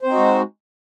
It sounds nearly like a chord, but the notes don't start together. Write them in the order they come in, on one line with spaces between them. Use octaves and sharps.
C5 C4 D#4 F#4 G#3